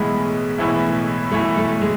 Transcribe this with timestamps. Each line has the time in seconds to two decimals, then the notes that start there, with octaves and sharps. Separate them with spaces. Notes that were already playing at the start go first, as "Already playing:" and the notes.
Already playing: B1 A2 E3 G#3 B3 E4
0.58 B1 A2 E3 B3 E4
1.32 B1 A2 E3 A3 B3 E4
1.57 A3
1.81 G#3